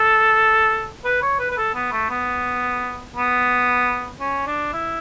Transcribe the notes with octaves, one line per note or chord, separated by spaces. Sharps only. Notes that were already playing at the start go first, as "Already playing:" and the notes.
Already playing: A4
B4
C#5
B4
B4
A4
B3
A3
B3
B3
C#4
D4
E4